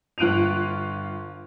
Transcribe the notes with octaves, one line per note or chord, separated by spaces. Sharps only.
G1 F4 F#6 D7 D#7 F7